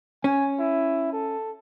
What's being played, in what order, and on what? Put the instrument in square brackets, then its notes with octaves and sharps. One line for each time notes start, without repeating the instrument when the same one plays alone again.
[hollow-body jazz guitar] C#4 [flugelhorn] G#5
[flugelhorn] E4
A4